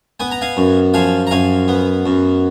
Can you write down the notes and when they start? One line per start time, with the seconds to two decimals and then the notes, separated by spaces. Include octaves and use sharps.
0.20 B3 G#5
0.31 A#5
0.41 F5 G#5
0.57 F#2
0.94 F3 F5 G#5
1.27 A#5
1.31 F#2 F5 G#5
1.68 B3
2.06 F#2